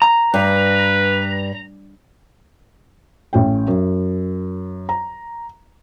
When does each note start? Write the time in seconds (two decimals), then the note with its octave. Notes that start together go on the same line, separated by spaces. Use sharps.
0.02 A#5
0.34 G2 B4
3.33 A1 C#4 G5
3.68 F#2
4.89 A#5